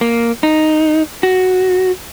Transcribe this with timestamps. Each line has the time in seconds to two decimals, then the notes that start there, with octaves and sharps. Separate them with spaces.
0.01 A#3
0.43 D#4
1.23 F#4